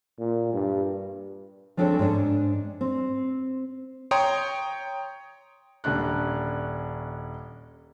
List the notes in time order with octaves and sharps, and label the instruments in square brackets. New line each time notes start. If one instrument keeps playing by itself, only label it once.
[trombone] A#2
G2
[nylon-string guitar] F3 C4 D4 G#4 A4 C#5
G#2 D4
C4
[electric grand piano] C#5 G5 A#5 C6 D#6
[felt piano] D#1 C#4 D4 F#6